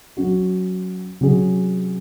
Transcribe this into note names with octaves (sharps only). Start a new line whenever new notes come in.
F#3 C#4 F#4
C3 F#3 C#4 G#4